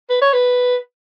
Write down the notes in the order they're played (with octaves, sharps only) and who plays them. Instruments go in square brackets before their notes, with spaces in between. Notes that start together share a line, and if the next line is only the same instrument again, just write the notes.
[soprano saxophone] B4
C#5
B4